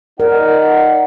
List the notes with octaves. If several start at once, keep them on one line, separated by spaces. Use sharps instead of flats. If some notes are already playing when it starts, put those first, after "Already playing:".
D#4 A#4 D5 F#5